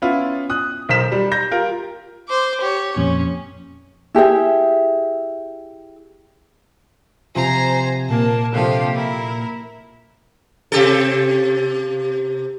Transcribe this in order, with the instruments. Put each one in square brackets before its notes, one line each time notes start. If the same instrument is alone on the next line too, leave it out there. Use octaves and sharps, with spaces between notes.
[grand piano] B3 C#4 E4 F4
D#6 F#6
B1 A#4 C5 F6 B6 E7
G3
A#5 G6 A#6
F4 G4 A#4
[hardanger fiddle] C5 D6
G4 C#5
[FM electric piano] F2 A#2 [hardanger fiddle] C#4
[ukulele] E4 G4 G#4 E5
[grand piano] C3 F3 [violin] C5 A#5 [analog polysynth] G#5
[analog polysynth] A#2 [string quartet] A#3 [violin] A5
[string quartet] C3 F3 F5 [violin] D4 G4 [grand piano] A4
[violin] E4 [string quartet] A#4
[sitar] C3 G4 A4